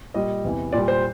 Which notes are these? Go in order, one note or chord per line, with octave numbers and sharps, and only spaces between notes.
A#2 G3 D#5
E2 C3 E3
A#2 G3 D5
C5